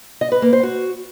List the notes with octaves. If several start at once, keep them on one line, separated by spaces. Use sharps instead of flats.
D#5
B4
A#3
C5
F#4